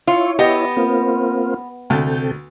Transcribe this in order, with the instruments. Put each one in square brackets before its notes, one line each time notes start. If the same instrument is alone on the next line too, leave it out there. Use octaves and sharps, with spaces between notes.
[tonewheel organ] E4 C#5 [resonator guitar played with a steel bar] F4
[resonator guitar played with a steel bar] B3 [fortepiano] G4 D#5
[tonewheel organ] A#3 C4 F4
[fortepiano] D2 [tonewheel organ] C3 A4 G5